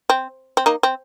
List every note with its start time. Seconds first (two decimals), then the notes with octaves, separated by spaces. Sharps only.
0.10 C4
0.57 C4
0.66 A#3 D#4
0.83 C4